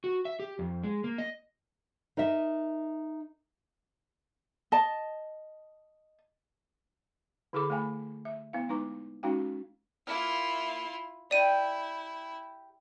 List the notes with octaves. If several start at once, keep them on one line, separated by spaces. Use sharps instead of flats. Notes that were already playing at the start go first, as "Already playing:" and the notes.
F#4
E5
G4
F2
G#3
A#3
D#5
D#4 A#4 D#5 E5
D#5 A5
D3 E4 G#4 A4 B5 D6
A3 F5 G5 G#5 B5
E5
B3 E4 F5
G#3 D#4 B4 A#5 D6
G#3 C#4 D#4 F#4 F5 G5
A#3 E4 F4 E5 F6
E4 G4 D5 G5 D#7